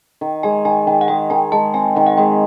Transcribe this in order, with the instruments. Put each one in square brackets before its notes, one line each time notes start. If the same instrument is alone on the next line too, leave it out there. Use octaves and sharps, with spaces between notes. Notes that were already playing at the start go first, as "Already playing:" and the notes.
[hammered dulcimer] D#3
[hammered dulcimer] G#3 [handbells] G#5
[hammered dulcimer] D#3 [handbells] G#5
[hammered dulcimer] D#3 [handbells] G5
[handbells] F#5
[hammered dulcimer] G#3 [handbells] G5
[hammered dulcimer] D#3 [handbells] G#5
[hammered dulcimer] G#3 [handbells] A5
[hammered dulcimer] C4 [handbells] G#5
[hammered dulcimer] D#3 [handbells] F#5
[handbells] F#5
[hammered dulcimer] G#3 [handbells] G5